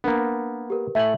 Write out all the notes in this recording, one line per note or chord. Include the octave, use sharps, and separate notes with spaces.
A#3 B3 D4 A#4
G4 A#4 B4
A2 A3 E5 G#5 F#7